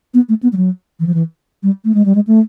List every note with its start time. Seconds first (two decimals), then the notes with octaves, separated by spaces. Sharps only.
0.14 B3
0.29 A3
0.43 B3
0.53 G3
0.57 F#3
1.00 E3
1.07 F3
1.14 E3
1.63 G3
1.85 A3
1.95 G#3
2.05 G3
2.15 G#3
2.27 A3